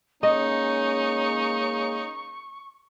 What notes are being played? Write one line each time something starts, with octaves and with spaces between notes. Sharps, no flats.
G#3 A#3 C#4 D#4 D#5 C#6